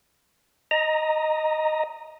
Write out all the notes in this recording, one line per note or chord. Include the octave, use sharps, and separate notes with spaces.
D#5 A#5